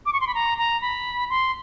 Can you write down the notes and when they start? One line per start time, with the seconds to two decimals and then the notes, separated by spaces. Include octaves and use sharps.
0.06 D6
0.13 C#6
0.21 C6
0.27 B5
0.34 A#5
0.58 A#5
0.82 B5
1.30 C6